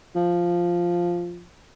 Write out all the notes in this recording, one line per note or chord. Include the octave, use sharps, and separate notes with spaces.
F3